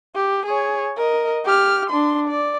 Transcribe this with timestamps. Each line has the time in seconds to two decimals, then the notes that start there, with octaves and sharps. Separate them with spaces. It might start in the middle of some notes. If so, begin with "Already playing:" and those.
0.15 G4
0.45 G#4 C#5
0.98 A#4 D#5
1.45 G4 F6
1.90 D4 C6
2.28 D5